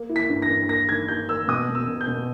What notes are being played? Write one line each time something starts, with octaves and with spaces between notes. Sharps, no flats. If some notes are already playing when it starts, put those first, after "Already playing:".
Already playing: A#3
E4
B6
G2
A#6
G2
A#3 A#6
D#3 G#6
D#4 G6
A#3 E6
B2 D#6
B2
E6
B2
G6
B2